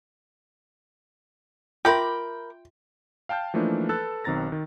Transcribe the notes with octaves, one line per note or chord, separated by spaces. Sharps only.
F4 A#4 E5 G5 B5 C6 D6
F5 G5 A5 F6 G6
E3 F3 A3 A#3 D4 D#4
A4 B4 E6 F#6 A6
B1 D#3 C4 A#5 A6 A#6
D#3